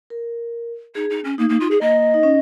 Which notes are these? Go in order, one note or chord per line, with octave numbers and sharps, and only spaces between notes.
A#4
D#4 G#4
D#4
C#4
A#3 D#4
A#3
F4
G#4
A#3 D#5
D#4
C#4